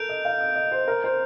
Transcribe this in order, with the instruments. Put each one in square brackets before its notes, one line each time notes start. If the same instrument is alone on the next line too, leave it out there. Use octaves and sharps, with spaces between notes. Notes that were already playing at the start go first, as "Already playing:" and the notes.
Already playing: [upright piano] A4 A#4 [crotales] G6 D7 F7
[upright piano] D#5
F5
D#5
D#5
C5
A#4
C5